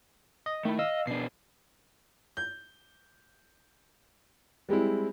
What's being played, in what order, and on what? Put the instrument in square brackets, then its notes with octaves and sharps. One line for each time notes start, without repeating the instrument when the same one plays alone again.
[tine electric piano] D#5
[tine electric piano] D#3 E4 [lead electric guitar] A3
[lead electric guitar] D#5 [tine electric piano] F5 E6
[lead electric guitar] B2 D4 [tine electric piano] C7
[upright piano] G6
G3 G#3 C4 E4